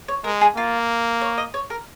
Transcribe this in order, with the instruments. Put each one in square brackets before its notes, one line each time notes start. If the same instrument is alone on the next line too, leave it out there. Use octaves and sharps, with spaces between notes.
[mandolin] C#5
[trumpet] G#3 [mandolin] A#4
[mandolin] G#4
[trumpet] A#3 [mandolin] F4
[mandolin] C#5
D#5
C#5
A#4